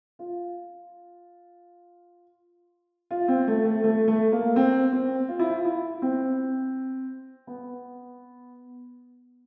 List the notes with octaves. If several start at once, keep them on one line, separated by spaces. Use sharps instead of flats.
F4
F4
C4
A3
A3
A3
A3
A#3
C4
C4
F4
E4
F4
E4
C4
B3